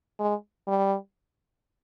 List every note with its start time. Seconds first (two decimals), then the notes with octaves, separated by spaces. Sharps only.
0.20 G#3
0.67 G3